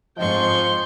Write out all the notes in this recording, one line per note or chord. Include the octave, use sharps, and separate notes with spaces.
F2 G#2 F3 D#5 G5 C6 C#6